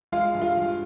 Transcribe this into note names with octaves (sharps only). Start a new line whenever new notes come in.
G#3 F4 F5
G2
F4 F5
G2